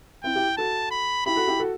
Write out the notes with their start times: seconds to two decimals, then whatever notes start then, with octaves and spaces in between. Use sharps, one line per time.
0.24 C4 E4 G5
0.35 E4 G4
0.57 F#4 A4 A5
0.91 B5
1.26 E4 G4 B5
1.36 F#4 A4
1.47 E4 G4
1.60 F#4 A4